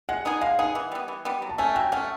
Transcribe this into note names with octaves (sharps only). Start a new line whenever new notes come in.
G#3 F#5
B3 D#4 G#4
G#3 F5
B3 D#4 G#4 F#5
E3
G3 B3
E3
G3 B3
F#3
A5
A3 C#4 G#5
F#3 G5
A3 C#4 F#5